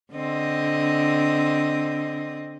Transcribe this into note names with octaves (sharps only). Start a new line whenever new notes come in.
D3 C4 D#5